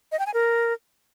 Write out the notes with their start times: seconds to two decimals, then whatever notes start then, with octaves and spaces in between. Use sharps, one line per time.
0.12 D#5
0.19 G5
0.26 G#5
0.34 A#4